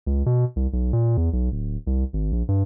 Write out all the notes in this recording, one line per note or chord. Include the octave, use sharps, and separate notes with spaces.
C#2
B2
C2
B1
A#2
E2
B1
D1
C2
G#1
A#1
G2